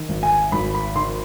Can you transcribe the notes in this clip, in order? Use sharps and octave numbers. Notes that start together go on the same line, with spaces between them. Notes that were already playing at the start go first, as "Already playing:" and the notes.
Already playing: D#3
G#1
G#5
G#1 B5
B5
D#3 C6